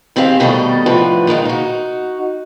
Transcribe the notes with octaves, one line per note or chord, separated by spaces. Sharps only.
D#3 C4 G4 G#4 C#5 F5
B2 D#3 G3 A3 A4 D#5
A2 D3 F3 B4
A#2 D#3 G#3 F4
D#4 F#4